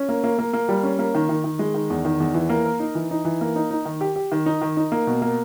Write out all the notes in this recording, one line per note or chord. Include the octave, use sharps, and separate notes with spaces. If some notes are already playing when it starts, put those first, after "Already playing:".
Already playing: C#4
A#3
A#3
A#3
A#3
G3
C#4
A#3
D#3
D#3
D#3
G#3
D#3
E2
D#3
E2
E3
A#3
A#4
D#4
E3
D#4
E3
A#3
D#4
D#4
D#3
G4
G4
D#3
D#4
D#3
D#4
A#3
B2
A#3